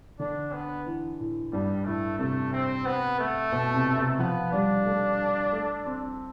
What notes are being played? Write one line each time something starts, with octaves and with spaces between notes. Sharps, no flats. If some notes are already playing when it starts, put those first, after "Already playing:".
D3 D4
B3
E3
A2
G2 G3
A2 A3
C3 A3
C4
B3
A3
B2
C3
C3
F3 B3
G3 D4
A3
A3
C4